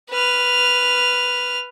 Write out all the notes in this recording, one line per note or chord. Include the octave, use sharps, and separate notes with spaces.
B4 F6